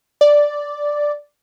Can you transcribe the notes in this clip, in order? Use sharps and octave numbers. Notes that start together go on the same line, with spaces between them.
D5